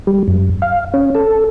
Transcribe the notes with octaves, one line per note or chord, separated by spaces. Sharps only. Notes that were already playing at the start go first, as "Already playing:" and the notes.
G3
F#2
F5
C#4
A4